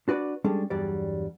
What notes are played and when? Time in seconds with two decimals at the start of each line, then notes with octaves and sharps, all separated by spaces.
0.08 D4 F#4 B4 D5
0.44 G3 G#3 C#4 D4 G#4 A4
0.70 E2 G2 F#3 G3 D5